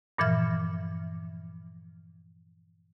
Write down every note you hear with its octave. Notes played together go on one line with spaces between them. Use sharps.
G2 A#2 E3 F3 E5 F6